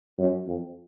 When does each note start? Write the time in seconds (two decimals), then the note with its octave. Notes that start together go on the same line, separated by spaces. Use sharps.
0.18 F#2
0.47 F2